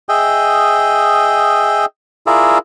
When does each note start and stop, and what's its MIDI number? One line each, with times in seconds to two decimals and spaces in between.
0.09 1.85 68
0.09 1.85 75
0.09 1.85 76
0.09 1.85 79
2.27 2.58 64
2.27 2.58 65
2.27 2.58 68
2.27 2.58 70
2.27 2.58 74
2.27 2.58 76